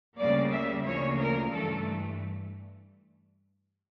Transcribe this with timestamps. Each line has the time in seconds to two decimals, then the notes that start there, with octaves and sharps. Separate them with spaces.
0.17 D2 C#3 G3 A#3 D5
0.51 E5
0.84 D2 C#3 F3 A#3 C#5
1.18 A#4
1.52 G2 E3 A3 A4